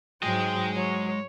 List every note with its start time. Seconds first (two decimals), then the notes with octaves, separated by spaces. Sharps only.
0.23 G#2 F#3 G#3 D#5 G5
0.75 F#3 C#5